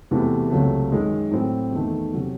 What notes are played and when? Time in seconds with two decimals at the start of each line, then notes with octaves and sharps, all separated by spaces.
0.11 E1 E2 C3 E3 A3
0.50 C#2 C3 F#3 A3
0.91 F#2 D#3 G#3
1.31 A2 F#3 C4
1.73 E2 D#3 A3
2.13 C3 F#3 C#4